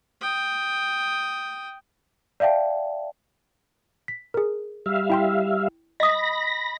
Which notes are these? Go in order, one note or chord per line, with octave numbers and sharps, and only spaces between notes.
G5 D#6
D5 E5 F5 G5 A5
B6
G#4 A#4
G3 E5 F5
E4 G5 C6
D#5 B5 D#6 A#6